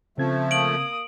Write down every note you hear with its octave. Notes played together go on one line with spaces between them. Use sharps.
C#3 F3 A3 C4 G#6
A#3 D#6 D7 F#7